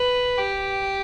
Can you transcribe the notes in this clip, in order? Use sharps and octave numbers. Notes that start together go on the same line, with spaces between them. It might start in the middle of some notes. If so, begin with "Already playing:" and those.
Already playing: B4
G4